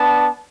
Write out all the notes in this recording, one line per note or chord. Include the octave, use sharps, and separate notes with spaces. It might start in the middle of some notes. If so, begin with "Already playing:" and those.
Already playing: B3 D4 A5